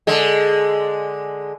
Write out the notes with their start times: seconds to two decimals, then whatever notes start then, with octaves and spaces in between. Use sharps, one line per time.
0.07 D3 G#3